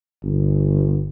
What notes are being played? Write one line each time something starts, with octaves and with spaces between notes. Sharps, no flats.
G1